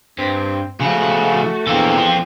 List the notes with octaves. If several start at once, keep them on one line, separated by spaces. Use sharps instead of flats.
G2 C4
C#3 F3 A3 F#4
E2 D3 A#3 C4 A4
F3